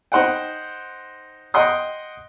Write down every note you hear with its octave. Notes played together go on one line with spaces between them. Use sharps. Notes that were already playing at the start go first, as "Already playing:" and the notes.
D#4 C5 F#5 G5
D#5 F#5 G5 C6 D#6